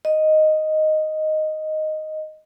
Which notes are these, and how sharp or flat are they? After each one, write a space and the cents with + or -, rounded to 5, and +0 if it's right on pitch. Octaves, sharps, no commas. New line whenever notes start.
D#5 +0